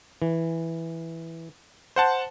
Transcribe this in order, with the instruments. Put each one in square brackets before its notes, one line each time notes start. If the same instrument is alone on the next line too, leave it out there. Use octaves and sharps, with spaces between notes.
[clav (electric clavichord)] E3
[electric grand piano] C5 F#5 A5